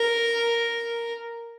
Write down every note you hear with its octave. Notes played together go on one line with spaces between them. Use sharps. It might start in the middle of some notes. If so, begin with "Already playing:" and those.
Already playing: A#4